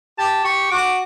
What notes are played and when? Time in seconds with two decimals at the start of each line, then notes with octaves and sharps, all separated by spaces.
0.18 G4 A5
0.44 G4 C#6
0.71 F#4 D6